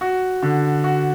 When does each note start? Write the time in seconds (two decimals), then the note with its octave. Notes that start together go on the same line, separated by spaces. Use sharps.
0.01 F#4
0.43 D3
0.84 F#4